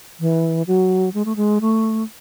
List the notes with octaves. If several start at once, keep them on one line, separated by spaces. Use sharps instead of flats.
E3
F#3
G#3
A3
G#3
A3